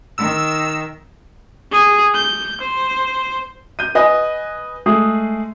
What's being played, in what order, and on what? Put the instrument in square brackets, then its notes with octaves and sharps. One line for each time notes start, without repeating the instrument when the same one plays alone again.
[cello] D#3 [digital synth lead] E6
[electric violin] G#4
G6
C5
[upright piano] G6 D#7
B4 D#5 G#5
G#3 A3 G#4